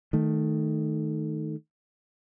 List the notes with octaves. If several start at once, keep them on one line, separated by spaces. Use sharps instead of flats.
D#3 A3